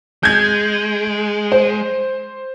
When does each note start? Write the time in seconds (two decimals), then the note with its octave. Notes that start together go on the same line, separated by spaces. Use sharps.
0.23 G#3 G6 G#6
1.52 C5